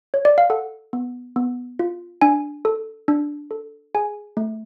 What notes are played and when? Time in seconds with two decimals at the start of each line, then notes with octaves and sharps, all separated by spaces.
0.14 C#5
0.25 D5
0.38 F5
0.50 A4 F#5
0.93 B3
1.36 B3
1.79 F4
2.22 D4 G#5
2.65 A4
3.08 D4
3.51 A4
3.95 G#4 G#5
4.37 A3